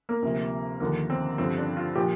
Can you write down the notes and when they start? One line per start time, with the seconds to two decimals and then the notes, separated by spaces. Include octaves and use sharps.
0.09 A#3
0.22 D2 C3 F3
0.80 D#2 D3 F3 A#3
1.10 C4
1.38 G2 D3 F3 C4
1.58 D4
1.77 F4
1.95 A#2 F3 G4